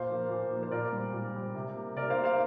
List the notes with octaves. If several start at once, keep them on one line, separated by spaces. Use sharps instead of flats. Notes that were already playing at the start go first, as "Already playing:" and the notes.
Already playing: A#2 C5 F5
F3 A#3
A#2
F3
A#3
C5
A#2 A#4 D5
G3 C4
A#2
G3 C4
C3
A#3
C3 A#4 D5
C5 F5
A#3
C5 F5